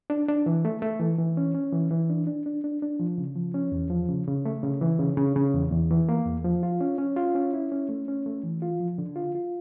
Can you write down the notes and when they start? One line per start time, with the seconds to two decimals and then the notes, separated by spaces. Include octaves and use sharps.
0.10 D4
0.28 D4
0.46 E3
0.65 A3
0.82 A3
1.00 E3
1.19 E3
1.37 C#4
1.55 C#4
1.72 E3
1.91 E3
2.10 D4
2.27 D4
2.46 D4
2.64 D4
2.82 D4
3.00 F3
3.18 C#3
3.36 F3
3.54 C#4
3.72 E2
3.90 F3
4.09 C#3
4.27 C#3
4.45 A3
4.63 C#3
4.81 E3
4.99 C#3
5.17 C#3
5.36 C#3
5.54 E2
5.71 E2
5.91 E3
6.09 A#3
6.26 E2
6.44 F3
6.63 F4
6.81 C#4
6.98 C#4
7.16 F4
7.35 C#4
7.53 E4
7.72 C#4
7.89 A3
8.08 C#4
8.26 A3
8.43 E3
8.62 F4
8.80 F3
8.98 D3
9.16 F4
9.35 F4